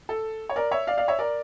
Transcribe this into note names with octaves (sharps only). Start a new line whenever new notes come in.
A4
C#5
A#4 D5
C#5 E5
D5 F5
D5 F5
C#5 E5
A#4 D5